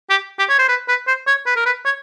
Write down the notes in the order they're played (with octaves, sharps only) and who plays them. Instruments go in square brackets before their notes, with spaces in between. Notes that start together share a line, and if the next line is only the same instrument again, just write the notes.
[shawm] G4
G4
C#5
C5
B4
B4
C5
C#5
B4
A#4
B4
C#5